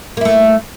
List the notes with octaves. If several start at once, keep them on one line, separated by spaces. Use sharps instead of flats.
A3 A#3 E4